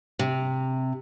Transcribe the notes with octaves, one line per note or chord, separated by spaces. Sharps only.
C3